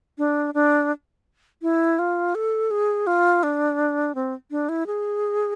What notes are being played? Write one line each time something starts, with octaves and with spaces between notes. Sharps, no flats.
D4
D4
E4
F4
A4
G#4
F4
D4
C4
D4
E4
G#4